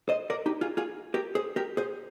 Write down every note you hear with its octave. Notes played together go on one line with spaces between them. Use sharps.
C5 D#5
A#4 D5
D#4 G4
F4 G#4
F4 G#4
G4 A#4
G#4 C5
G4 A#4
G#4 C5